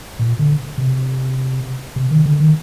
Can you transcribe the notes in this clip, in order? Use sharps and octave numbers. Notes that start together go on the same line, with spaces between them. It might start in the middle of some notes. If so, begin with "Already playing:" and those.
A#2
D3
C3
C3
D#3
D3
D#3